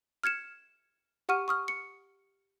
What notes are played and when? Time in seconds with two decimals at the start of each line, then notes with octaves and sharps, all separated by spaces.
0.23 F6 G#6 C#7 E7
1.29 G4 F#5 C#6 F6 D#7
1.48 C#6 D#6 F6
1.68 C#7